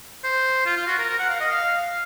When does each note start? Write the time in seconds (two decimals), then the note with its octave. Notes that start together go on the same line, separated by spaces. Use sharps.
0.24 C5
0.66 F4
0.77 F4
0.87 F#4
0.98 A#4
1.09 A#4
1.19 F#5
1.29 F5
1.41 D#5
1.51 F5